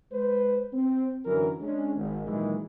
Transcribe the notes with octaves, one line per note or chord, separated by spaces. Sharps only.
G#3 B4 C5
C4
F#2 D3 E3 F#3 A#4
G#3 C#4 D4
G#1
A#2 D#3 E3 F#3 G#3